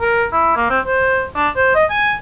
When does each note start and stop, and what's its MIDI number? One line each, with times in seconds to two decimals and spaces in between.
0.01 0.26 70
0.32 0.56 64
0.57 0.67 58
0.70 0.79 60
0.85 1.24 72
1.35 1.49 62
1.56 1.71 72
1.75 1.85 75
1.90 2.13 80